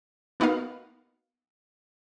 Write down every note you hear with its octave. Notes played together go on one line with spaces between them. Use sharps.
A#3 B3 D#4 F#4 F5